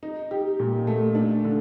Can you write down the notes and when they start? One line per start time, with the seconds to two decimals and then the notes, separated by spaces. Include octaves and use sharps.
0.03 D#4
0.31 G4
0.60 A#2
0.87 A3
1.15 D4
1.44 D3